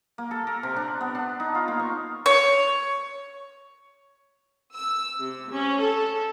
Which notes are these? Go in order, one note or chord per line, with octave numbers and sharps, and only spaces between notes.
A#3
A4
A#4
C3
D4
B3
D4
D#4
F4
A#3
C#6
C#5
E6
C3
C#4
A4